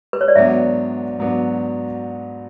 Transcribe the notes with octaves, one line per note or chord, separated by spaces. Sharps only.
B4
C#5
D5
G#2 F#3 B3 D4 E5
G#2 F#3 B3 D4